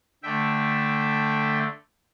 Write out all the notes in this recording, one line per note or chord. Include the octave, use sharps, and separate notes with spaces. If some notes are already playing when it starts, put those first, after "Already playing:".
D3 A3 E5 G5